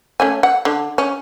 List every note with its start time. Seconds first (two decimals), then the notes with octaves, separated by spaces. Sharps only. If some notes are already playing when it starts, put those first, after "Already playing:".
0.20 A3 C#4 G#5
0.43 F#5
0.65 D3
0.98 C#4